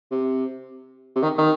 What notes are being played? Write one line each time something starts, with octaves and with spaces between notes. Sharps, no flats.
C3
C3
D#3
D#3